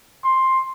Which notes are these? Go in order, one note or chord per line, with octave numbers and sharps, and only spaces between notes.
C6